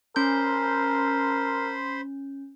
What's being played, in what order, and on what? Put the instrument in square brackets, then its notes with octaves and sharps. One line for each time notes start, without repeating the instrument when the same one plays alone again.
[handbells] C#4 G6 [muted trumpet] A#4 [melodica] C5 B5 C6